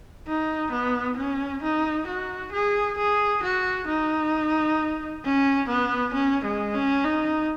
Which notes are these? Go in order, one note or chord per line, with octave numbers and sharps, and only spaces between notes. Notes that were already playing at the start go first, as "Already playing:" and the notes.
D#4
B3
C#4
D#4
F#4
G#4
G#4
F#4
D#4
C#4
B3
C#4
G#3
C#4
D#4